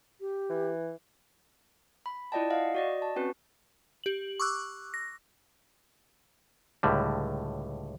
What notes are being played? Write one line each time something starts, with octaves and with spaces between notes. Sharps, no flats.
G4
E3
B5
E4 F4 D5 D#5 G5 A5
D#5 F5 F#5
F#4 D5 D#5
A5
C4 C#4 F#4 B4
G4 F#7
C#6 D6 E6 F#6
A#6
C#2 A2 D3 G3